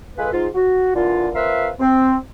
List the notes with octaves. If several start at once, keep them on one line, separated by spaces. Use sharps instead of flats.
G#3 F4 G#4 A4 B4
G#2 F4
F#4
A#2 D3 E3 F4
C4 F4 A#4 B4 E5 F5
C4